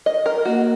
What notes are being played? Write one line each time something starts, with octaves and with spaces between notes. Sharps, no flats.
D#5
A#4
A#3 F#4